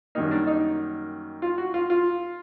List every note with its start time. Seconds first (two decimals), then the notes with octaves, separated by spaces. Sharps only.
0.15 F#2 D#3 G3 A#3 D#4
0.31 D4
0.47 D#4
1.42 F4
1.58 F#4
1.74 F4
1.90 F4